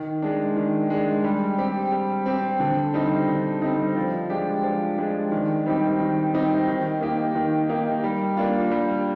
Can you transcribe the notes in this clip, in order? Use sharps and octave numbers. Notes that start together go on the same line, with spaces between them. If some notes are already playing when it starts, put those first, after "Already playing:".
Already playing: D#3
G#3 D4
D#3
G#3 D4
G3
C4 G4
G3
C4 G4
D3
G3 C4 D#4
D3
G3 C4 D#4
F3
G#3 D4 G4
F3
G#3 D4 G4
D#3
G3 C4 D#4 G4
D#3
G3 C4 D#4 G4
D#3
A#3 D#4 G4
D#3
A#3 D#4 G4
G3
A#3 D4 F4
G3